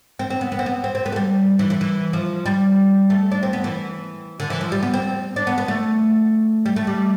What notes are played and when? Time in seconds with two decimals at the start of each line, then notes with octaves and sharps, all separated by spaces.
0.19 C4
0.30 C4
0.41 B3
0.52 B3
0.59 C4
0.66 B3
0.84 C4
0.95 C4
1.06 B3
1.12 A3
1.16 G3
1.59 E3
1.70 E3
1.81 E3
2.13 F3
2.46 G3
3.10 A3
3.32 D4
3.43 C4
3.53 B3
3.64 E3
4.40 D3
4.50 E3
4.61 F3
4.72 G3
4.83 B3
4.94 C4
5.36 D4
5.47 B3
5.58 B3
5.68 A3
6.66 G3
6.76 A3
6.87 G3